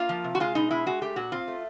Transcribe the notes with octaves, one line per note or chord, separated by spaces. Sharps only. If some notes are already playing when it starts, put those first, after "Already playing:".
Already playing: A#3 F4
F3
C3
F#4
G#3 F4
B2 D#4
G#3 E4
G#3 F#4
A3 G4
A#2 F#4
C4 F4
A3